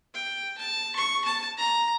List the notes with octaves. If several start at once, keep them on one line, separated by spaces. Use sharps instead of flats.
G5
A5
C#6
A5
A#5